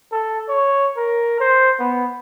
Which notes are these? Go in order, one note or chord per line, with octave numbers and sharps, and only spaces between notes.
A4
C#5
A#4
C5
B3